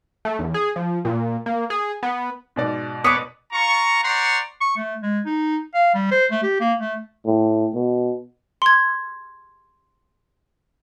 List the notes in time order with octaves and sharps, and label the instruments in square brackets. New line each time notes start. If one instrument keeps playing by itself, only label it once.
[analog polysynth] A3
E2
G#4
F3
A#2
A#3
G#4
B3
[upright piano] G#2 B2 D5
[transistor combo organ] B3 C#5 [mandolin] B4 D6 [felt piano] D#6
[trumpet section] F4 A#5 C#6
C5 D5 F#5 A#5 C6 C#6
[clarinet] C#6
A3
G#3
D#4
F5
G3
C5
A3
G4
A#3
A3
[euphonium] A2
B2
[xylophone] C6 G#6